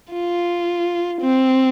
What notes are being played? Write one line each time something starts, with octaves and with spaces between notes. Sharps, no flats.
F4
C4